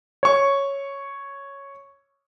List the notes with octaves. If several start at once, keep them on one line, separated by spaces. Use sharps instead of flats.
C#5 C#6